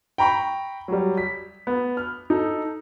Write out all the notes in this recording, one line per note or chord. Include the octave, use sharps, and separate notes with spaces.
G5 A#5 B5 C#6
F#3 G3
B6
B3
F6
D#4 A4